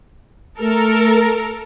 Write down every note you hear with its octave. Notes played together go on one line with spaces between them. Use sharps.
A3 A4 A#4